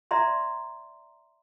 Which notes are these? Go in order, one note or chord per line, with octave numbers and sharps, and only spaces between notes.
D5 E5 A#5 C6